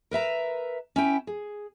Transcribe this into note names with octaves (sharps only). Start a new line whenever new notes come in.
A#4 B4 E5 A#5
C#4 E4 G5
G#4